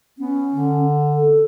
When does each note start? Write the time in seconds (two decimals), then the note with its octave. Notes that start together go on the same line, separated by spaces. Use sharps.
0.19 B3 C#4
0.52 D3
1.13 A4